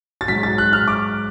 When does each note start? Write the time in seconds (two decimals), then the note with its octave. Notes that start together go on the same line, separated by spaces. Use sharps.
0.21 A6
0.28 G#2 F#3 B6
0.43 A6
0.58 F#6
0.73 F6
0.88 D6